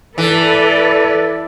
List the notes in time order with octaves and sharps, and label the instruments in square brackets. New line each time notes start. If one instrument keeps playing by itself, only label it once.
[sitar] E3 [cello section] A4 B4 D5